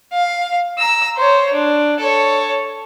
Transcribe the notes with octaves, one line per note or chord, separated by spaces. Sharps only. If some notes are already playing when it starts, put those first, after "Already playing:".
F5
A#5 E6
C5 C#5
D4
A4 C#5